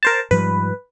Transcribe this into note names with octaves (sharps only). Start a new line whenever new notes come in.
A#4 C5 A5
G#2 F3 G3 B4